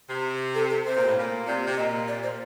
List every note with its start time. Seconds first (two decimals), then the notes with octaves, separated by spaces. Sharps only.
0.09 C3
0.55 A4
0.70 A4
0.85 C3 C5
0.97 A#2
1.08 A2
1.19 A#2
1.47 C3 D5
1.67 C3
1.77 A#2 D#5
2.08 D5
2.23 C5